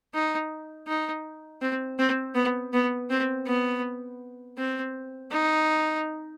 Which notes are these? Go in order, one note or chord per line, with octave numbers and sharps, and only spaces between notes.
D#4
D#4
C4
C4
B3
B3
C4
B3
C4
D#4